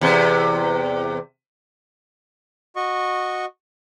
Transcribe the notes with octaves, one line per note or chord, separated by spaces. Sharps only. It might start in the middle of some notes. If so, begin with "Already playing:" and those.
E2 C3
F#4 D#5 C#6